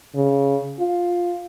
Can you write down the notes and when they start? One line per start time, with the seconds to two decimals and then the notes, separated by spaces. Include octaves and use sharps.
0.15 C#3
0.80 F4